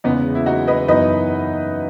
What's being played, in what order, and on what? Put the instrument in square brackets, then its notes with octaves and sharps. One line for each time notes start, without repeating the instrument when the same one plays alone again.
[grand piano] E2 C#3 G#3 [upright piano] B3 D#4
[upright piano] E4
D#4 F#4
B4 D#5
[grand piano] F#2 E3 B3 D#4 [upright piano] B4 D#5